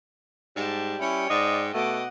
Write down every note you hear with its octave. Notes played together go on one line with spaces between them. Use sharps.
G#2 G3 G4 A5
C#4 E4 C#5 G5
G#2 D5 D#5
B2 A3 D#5 F#5 D6